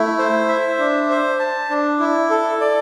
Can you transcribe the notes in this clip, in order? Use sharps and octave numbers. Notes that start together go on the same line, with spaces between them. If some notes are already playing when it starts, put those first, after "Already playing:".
Already playing: A3 E4
C5
E5
D4
C5
A5
D4
E4
A4
D5